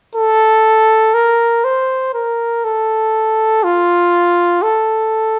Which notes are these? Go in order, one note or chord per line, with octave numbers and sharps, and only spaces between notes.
A4
A#4
C5
A#4
A4
F4
A4